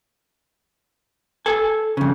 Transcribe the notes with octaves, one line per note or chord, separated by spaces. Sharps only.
A4 G#5
F2 C#3